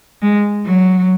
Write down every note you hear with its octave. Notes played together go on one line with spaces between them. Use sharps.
G#3
F#3